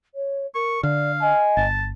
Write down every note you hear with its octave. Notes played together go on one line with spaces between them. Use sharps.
C#5
A#4 C#6
D3 D5 F5
D#5 G#5
G1 A5